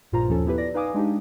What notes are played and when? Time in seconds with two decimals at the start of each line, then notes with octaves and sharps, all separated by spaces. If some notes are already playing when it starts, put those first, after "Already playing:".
0.12 A#1 G2 A#2 F4 C5 A#5
0.29 D#2 F3 C#4 A4
0.46 B3 E4 G4 B4
0.58 D5 A#6
0.74 D#4 B4 F5 G#5 D6 D#6
0.94 G#3 D4 D#4 G4